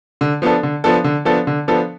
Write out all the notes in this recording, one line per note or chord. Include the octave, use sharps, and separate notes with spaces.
D3
F3 B3 D4 A4
D3
F3 B3 D4 A4
D3
F3 B3 D4 A4
D3
F3 B3 D4 A4